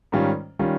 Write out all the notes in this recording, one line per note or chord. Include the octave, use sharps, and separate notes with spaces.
G#2 D#3 G3 C#4 F4
D#3 G3 C#4 F4